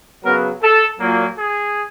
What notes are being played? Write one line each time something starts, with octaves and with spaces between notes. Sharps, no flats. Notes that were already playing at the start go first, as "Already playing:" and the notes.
C#3 F#3 B3 A#4
A4
A#2 F#3 A#3
G#4